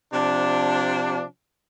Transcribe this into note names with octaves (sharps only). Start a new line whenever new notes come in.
C3 F3 D4